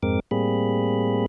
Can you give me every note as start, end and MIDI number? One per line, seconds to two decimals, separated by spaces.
0.03 0.20 41
0.03 0.20 44
0.03 0.20 56
0.03 0.20 60
0.03 0.20 70
0.03 0.20 86
0.31 1.26 45
0.31 1.26 55
0.31 1.26 58
0.31 1.26 60
0.31 1.26 68
0.31 1.26 83